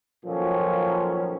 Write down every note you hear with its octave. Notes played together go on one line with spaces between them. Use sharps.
A#2 D#3 F3 F#3 C#4 A4